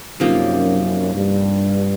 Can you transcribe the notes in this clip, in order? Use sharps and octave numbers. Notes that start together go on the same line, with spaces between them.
F#2 C3 F3 A#3 D#4
G2